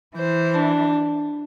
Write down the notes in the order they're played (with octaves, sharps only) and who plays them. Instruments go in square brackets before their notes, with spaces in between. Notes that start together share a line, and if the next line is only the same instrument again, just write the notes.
[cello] E3 [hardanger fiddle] C5
[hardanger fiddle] D4